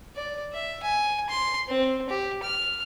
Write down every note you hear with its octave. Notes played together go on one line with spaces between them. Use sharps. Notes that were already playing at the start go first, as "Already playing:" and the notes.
D5
E5
G#5
C6
C4
G4
F6